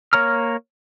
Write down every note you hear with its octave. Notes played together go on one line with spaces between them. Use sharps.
A#3 C#5 A#5 F6